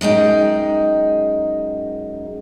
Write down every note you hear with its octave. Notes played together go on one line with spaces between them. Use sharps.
F#2 G#3 D#4 G5